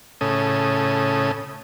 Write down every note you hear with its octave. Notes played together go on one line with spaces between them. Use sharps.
A2 C#3 C#4 A4 D#6